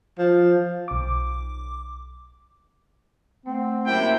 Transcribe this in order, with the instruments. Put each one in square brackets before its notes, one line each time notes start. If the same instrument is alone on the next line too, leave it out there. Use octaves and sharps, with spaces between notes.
[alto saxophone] F3
[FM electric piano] B1 D6
[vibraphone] A3 F#5 [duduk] C4
[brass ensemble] F#2 C3 E4 [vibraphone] A#3 A#4 [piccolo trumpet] G5